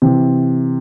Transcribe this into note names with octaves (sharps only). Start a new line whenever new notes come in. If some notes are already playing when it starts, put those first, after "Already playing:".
C3 E3